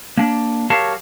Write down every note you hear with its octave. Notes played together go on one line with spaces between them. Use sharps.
A#3 D4
F#3 G4 A#4 C#5 F5 A5